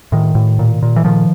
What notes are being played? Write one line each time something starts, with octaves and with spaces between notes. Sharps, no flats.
A2 D#3
A2
A#2
A#2
E3
A#2 D#3 F3